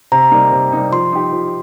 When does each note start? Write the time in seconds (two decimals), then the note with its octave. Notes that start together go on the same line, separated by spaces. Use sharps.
0.12 C3 A#5
0.31 G3 A#3 D#4
0.52 C3
0.72 G3 A#3 D#4
0.92 F3 C6
1.12 D#4 G4
1.32 F3